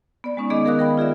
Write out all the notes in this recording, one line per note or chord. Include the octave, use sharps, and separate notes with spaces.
B3 D5
G#3 B3 C#4 D#4
D#3 B3 G#4 D#5 D6
G#4 A#4 F5 D#6 F#6
A#4 G5 B5
F4 G#4 D5 E5